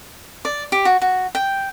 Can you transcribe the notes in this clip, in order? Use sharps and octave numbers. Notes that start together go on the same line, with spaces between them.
D5
G4
F#4
F#4
G5